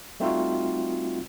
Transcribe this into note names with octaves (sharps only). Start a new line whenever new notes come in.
G3 A3 C4 D#4 F4 F#4